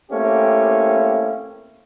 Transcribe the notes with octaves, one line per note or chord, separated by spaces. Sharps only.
A3 A#3 C4 C#4 E4 G4